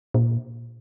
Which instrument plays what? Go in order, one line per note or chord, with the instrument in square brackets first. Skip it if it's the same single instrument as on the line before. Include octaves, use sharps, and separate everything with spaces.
[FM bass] A#2